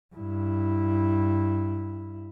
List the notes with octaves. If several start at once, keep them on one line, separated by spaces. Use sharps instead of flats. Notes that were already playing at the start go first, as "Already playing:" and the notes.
G2 E4